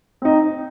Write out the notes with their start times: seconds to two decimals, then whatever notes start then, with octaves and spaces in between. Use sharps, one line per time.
0.22 C4 D#4